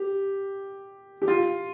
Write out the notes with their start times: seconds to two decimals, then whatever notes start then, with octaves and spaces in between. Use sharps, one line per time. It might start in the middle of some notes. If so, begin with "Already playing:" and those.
Already playing: G4
1.22 G4
1.28 F4